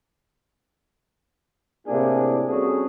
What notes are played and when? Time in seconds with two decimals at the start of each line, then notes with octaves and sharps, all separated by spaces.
1.87 A2 C3 A#3 D4 E4 G#4
2.46 G3 C4 C#4 F#4 G#4 A4